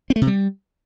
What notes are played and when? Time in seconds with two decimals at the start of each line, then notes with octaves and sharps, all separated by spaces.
0.10 C4
0.16 A3
0.21 C3
0.27 G3